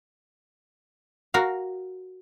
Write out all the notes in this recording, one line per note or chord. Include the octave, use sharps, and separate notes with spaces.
F#4 A#4 F5